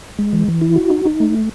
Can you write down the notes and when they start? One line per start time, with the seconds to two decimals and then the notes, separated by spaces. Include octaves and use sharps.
0.19 G#3
0.33 E3
0.48 E3
0.61 E4
0.76 F#4
0.90 D#4
1.05 D#4
1.20 A3